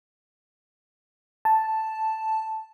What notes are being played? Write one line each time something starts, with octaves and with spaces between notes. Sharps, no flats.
A5